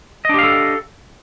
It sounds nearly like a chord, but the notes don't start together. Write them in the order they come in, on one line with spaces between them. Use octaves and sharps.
D#5 D4 G4 F5 A4